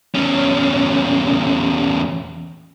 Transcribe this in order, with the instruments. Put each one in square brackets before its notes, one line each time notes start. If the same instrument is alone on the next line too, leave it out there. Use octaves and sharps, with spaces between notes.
[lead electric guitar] E2 C#4